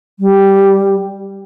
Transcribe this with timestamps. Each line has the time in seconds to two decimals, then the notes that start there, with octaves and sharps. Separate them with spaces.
0.20 G3